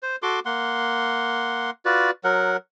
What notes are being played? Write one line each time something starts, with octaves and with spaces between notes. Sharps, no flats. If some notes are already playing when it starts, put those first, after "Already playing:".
C5
F#4 A4 C6 D6
A#3 F#5 C6
F4 F#4 B4 D5
F#3 A#4 F#5